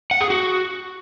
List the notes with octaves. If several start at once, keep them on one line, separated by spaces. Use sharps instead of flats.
F#5
G#4
F#4